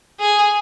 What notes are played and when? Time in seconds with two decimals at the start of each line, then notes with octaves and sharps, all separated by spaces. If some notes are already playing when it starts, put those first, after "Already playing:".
0.20 G#4